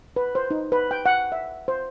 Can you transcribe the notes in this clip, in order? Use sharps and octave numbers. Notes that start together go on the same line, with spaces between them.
B4
C5
D#4
B4
G5
F#5
E5
C5